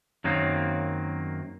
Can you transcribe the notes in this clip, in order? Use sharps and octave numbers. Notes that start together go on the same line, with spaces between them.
F#2 D#3 F#3 A#3 C4